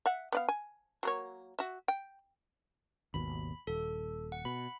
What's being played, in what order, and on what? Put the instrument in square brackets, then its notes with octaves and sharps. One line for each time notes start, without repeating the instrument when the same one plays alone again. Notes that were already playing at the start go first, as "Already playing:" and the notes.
[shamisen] E5 F#5
B3 D5 F5
G#5
F#3 A#3 C#5
F#4 E5
G5
[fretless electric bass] G#1 D#2 B2 [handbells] B5
[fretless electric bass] D#1 [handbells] A4
[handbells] F#5
[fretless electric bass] B2 [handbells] B5